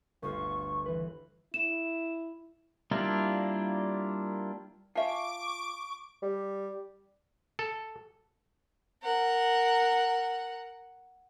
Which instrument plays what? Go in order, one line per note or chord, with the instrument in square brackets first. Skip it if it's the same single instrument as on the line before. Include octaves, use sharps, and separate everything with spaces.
[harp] G1 D2 F4 [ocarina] C#6
[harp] E3 B4
[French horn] E4 [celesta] E7
[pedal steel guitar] G3 A#3 D4 E4 F4
[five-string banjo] F4 E5 [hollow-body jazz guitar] F5 G#5 A5 [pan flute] C#6 [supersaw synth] D6 D7
[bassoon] G3
[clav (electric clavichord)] A4
[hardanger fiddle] A#4 F#5